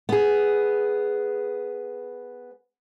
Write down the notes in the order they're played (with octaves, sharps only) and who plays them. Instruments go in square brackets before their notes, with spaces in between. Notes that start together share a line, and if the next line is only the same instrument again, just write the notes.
[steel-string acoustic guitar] B3 G#4